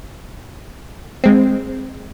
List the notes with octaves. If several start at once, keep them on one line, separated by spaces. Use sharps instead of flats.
G#3 C4